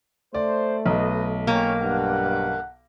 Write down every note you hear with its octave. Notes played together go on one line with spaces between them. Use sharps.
A3 C5 D5
B1 B4 D#5
A#3 C#4 C#5 G5
G2 F#5